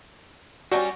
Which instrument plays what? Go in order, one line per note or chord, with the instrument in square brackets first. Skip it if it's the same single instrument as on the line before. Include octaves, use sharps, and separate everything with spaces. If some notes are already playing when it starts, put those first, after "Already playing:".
[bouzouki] G3 A3 C#4 [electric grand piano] F#4